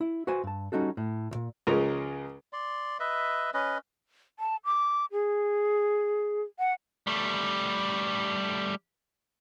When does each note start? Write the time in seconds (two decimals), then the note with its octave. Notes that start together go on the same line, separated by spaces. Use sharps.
0.01 E4
0.27 F#4 B4 C5 G#5
0.44 G2 A5
0.72 G3 C#4 D#4 F#4 A4
0.97 A2
1.31 C2 A#2
1.67 C#2 C#3 F3 G#3 A#4 A#5
2.53 D5 C6
3.00 B4 D#5 E5
3.54 C#4 B4 D#5
4.39 A5
4.65 D6
5.12 G#4
6.59 F#5
7.07 G3 A3